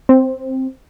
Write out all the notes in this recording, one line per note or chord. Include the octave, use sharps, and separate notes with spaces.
C4